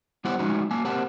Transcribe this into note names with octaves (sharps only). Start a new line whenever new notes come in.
G3 B3 E4 G4 C5 F#5
F3 G#3 A3 C#4 D#4 F#4
A#3 G#5 A5
A#3 C4 G4 F#5 A5